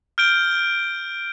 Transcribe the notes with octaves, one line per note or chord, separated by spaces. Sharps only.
F6 G6 D7 G7